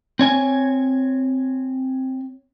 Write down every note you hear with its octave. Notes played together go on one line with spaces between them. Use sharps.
C4 C#5 G#5